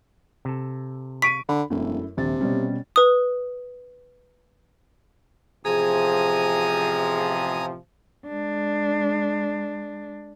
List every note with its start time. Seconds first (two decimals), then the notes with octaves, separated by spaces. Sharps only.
0.45 C3 A4
1.22 C#6 B6 D7 D#7
1.49 D3 B5
1.70 E1 F#2 A3 E4
2.17 D#1 A#1 C3 A6
2.41 B2 G3 C#4
2.96 B4 D#6
5.65 A1 C3 F3 G#4 G#5 A#5 D#6
8.27 G#3 D4